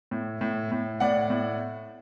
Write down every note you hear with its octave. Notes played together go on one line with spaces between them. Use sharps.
A2
A2
A2
A2 D5 F#5
A2